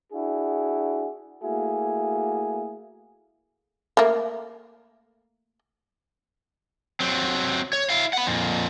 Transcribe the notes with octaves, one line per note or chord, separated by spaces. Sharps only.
D4 E4 F#4 G#4
A3 A#3 E4 F#4 G#4
A3 A#3
F#3 C4
C#5
E4 F5
F#5 B5
F2 A#2